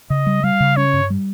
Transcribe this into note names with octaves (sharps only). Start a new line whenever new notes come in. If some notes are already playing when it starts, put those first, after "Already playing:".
C#3 D#5
G3
G3 F5
C#3
C#4 C#5
G2
G3